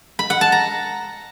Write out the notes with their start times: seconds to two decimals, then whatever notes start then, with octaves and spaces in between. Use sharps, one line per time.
0.19 B5
0.30 F#5
0.41 A5
0.52 A#5